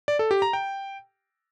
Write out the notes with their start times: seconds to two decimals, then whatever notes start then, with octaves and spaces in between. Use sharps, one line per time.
0.08 D5
0.19 A4
0.31 G4
0.42 A#5
0.53 G5